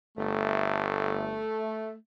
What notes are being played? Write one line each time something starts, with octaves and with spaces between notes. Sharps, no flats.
G1 A3